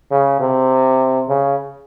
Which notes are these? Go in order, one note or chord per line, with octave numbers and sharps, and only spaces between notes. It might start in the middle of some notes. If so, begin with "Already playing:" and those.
C#3
C3
C#3